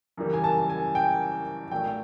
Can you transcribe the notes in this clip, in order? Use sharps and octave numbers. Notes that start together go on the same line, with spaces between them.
F#2 C#3 E3 G3 A#3
G#5
A5
G#5
G5
B1 A#2 F#3 A3 G5